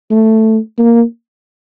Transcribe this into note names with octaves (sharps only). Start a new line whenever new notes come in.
A3
A#3